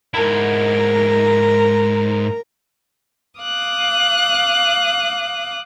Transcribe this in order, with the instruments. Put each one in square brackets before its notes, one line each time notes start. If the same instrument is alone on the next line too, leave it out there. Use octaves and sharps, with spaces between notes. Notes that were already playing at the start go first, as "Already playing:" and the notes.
[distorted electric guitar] G#2 E4 [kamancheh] A#4
[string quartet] F5 D6 D#6 F#6